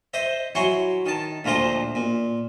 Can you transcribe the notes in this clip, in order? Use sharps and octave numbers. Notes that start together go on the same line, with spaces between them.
C5 D#5 E5
F#3 E4 G#5 C6 C#6
D#3 A5
D2 A#2 F3 C5 D#5
A#2